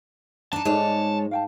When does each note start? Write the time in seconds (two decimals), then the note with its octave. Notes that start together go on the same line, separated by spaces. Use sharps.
0.53 D4 D#4 A5
0.65 G#2 G#3 G#4 A4 C#5 D5
1.31 F5 G5 A5